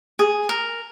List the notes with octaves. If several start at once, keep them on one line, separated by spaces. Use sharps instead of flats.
G#4
A#4